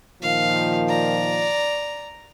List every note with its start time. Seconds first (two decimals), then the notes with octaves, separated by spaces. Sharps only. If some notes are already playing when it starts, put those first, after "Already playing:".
0.22 A#2 D#3 F3 F5
0.89 D5 A#5